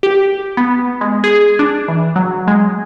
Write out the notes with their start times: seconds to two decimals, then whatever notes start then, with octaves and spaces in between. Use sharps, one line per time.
0.03 G4
0.57 B3
1.01 G#3
1.24 G#4
1.59 D4
1.88 E3
2.16 F#3
2.47 G#3